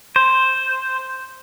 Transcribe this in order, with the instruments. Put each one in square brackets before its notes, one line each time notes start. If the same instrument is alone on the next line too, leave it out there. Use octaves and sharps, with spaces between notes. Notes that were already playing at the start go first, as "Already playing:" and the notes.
[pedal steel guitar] C5